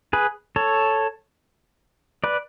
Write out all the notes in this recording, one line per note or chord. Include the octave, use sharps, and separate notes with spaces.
G#4 B4
A4 C#5
B4 D5